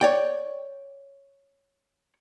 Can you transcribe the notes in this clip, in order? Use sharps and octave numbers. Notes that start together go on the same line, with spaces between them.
C#5 D5 G5